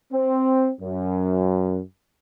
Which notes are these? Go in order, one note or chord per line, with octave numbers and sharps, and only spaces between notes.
C4
F#2